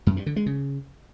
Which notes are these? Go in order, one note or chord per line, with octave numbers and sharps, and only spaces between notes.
F#2
G2
D3
G#3
C#3